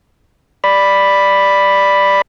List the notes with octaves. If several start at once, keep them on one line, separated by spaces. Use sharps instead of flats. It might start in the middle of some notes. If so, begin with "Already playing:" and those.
D5 B5